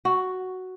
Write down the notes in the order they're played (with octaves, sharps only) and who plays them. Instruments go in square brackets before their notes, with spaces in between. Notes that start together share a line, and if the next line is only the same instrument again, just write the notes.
[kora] F#4